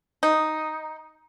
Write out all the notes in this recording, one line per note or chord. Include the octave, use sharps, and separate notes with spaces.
D#4